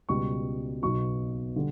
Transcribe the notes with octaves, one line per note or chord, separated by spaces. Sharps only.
C#2 B2 G3 C#6
B1 B2 F#3 C#6
D3 G3